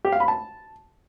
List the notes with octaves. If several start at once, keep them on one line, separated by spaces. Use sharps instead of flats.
G4
F5
B5
A5